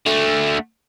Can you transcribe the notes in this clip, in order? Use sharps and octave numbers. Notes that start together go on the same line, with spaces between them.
D3 A3